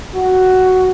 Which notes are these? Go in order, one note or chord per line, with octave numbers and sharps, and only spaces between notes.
F#4